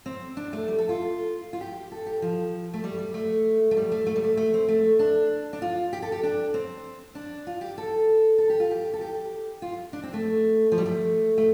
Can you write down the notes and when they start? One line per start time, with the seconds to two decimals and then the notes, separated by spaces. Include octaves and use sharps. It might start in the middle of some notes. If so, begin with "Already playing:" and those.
0.06 C4
0.37 D4
0.53 A3
0.68 G3
0.78 A4
0.89 F4
1.53 F4
1.61 G4
1.92 A4
2.06 G4
2.22 F3
2.74 A3
2.84 G3
2.99 G3
3.14 A3
3.71 A3
3.77 G3
3.92 A3
4.07 A3
4.16 G3
4.24 A3
4.37 A3
4.54 C4
4.68 A3
4.99 D4
5.53 D4
5.62 F4
5.93 G4
6.02 A4
6.12 G4
6.23 D4
6.54 C4
7.15 D4
7.47 F4
7.61 G4
7.78 A4
8.38 A4
8.50 G4
8.60 F4
8.71 G4
8.94 A4
9.01 G4
9.62 F4
9.93 D4
10.03 C4
10.13 A3
10.72 F3
10.78 G3
10.86 A3
11.38 A3